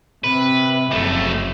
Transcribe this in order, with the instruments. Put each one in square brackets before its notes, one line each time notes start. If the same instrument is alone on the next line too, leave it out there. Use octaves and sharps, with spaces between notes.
[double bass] C3 [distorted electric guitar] B4
[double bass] F#1 [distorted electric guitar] F2 A3